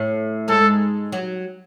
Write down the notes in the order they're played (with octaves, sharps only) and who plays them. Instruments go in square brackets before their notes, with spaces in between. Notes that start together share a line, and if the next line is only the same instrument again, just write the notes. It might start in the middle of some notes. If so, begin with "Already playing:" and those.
Already playing: [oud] A2 A3
[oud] G#2 G#3 [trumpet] A4
[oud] F#3